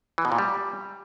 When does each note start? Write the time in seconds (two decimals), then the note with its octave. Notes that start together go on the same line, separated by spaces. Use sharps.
0.18 E3
0.25 B2
0.32 A#2
0.38 G3